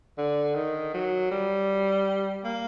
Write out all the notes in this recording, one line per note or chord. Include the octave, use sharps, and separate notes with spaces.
D3
D#3
F#3
G3
A#3